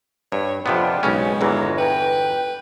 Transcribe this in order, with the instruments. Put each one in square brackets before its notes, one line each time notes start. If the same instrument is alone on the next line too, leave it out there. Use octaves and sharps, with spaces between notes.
[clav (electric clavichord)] G2 [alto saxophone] C#5
[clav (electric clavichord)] F2 C3 B3 [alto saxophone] D4 [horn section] F4 D5 G5
[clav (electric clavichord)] B1 C#3 C#4 [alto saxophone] G#3
[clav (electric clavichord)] G1 E2 E3 [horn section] F4 C#5 A#5
[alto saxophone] B4 [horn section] G5